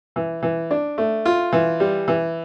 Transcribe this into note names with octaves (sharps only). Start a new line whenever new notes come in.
E3
E3
D4
A3
F4
E3
G3
E3